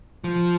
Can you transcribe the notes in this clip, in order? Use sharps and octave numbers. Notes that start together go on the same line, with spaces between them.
F3